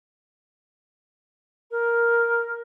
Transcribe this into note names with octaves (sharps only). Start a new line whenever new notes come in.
A#4